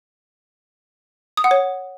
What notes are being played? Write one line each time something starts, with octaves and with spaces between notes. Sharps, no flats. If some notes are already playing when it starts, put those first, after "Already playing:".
D#6
F#5
C#5